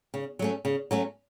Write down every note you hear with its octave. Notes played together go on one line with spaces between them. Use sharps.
C#3
F#3 A3 C#4
C#3
F#3 A3 C#4